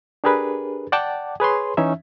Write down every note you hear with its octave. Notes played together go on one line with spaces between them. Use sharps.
D4 G4 G#4 A#4 B4
D5 F#5 G5 A5 D6
G#4 B4 C#5 C6
E3 C#4 D#4 E5